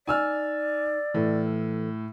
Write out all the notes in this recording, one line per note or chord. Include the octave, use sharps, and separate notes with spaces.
D#4 D5 G#5 E6 F6
A2 E3 A4